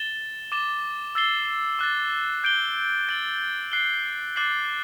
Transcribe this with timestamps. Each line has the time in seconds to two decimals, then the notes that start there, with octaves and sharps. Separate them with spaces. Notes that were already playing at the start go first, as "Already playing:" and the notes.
Already playing: A6 E7 G7
0.52 D6 A6 E7 G7
1.15 E6 A6 C7 G7
1.79 D6 F#6 A6
2.44 G6 D7 G7
3.09 A6 D7 F#7
3.72 F#6 C7 G7
4.36 D6 F#6 A6 C7 F#7